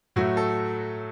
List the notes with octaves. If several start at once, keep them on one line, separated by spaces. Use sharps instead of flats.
A2 F#3 A3 F#4
A4